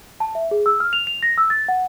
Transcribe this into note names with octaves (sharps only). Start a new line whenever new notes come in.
A5
E5
G#4
E6
F6
F7
F7
A#6
E6
A6
F#5